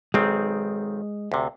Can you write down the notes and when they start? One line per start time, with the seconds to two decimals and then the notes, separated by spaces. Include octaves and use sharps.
0.14 B1 D#3 G#3 C4
1.32 D2 C3